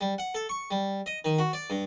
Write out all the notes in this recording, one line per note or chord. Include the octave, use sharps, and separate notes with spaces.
G3
F#5
A4
C#6
G3
D#5
D#3
F#4
D5
G2